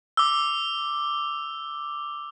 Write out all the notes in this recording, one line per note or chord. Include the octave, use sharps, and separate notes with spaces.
D6 E6